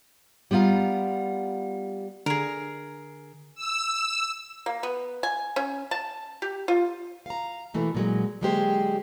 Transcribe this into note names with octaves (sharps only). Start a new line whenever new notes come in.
G3 B3 F4 F5 A#5
D3 G#4 A#4
E6
A#3
B3
G#5
C#4
A5
G4
F4
F5 A#5
B2 E3 A3 A#3
A#2 F#3 G#3
D3 F#3 G#3 A#3 G4 C5